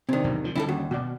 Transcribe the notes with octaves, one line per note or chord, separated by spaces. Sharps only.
C3 D#3 C4 D4
B1 E2 A2
D2 F3
D3 G3 C#4 E4 G4 A4
D#2 F#4
B2 F#4 D5